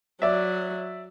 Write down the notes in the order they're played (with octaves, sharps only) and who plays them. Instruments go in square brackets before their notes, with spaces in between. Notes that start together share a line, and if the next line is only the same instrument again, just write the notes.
[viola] F#3 [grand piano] D5 E5